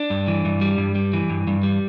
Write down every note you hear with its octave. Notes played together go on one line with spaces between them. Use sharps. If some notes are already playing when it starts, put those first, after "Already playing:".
Already playing: D4
G2
E3
G2
G3
G2
G3
E3
G2
G2
G3